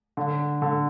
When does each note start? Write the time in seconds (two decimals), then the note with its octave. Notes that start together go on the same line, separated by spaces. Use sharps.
0.17 D3
0.62 D3